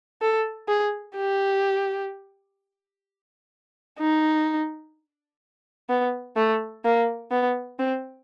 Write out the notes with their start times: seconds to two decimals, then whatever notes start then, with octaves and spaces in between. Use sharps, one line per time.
0.22 A4
0.68 G#4
1.16 G4
4.00 D#4
5.89 B3
6.36 A3
6.84 A#3
7.31 B3
7.79 C4